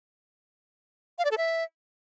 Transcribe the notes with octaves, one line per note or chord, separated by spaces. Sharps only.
F5
D5
A4
E5